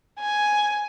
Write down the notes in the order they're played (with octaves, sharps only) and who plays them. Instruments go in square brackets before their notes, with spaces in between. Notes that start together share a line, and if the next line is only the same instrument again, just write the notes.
[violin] G#5